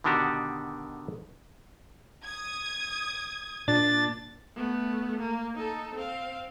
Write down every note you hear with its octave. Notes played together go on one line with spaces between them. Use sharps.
B2 D3 D#3 D4 F#4 G4
D#6 G#6
A#2 D4 A6
A3 B3
A#3
D#4 A4
C4 F5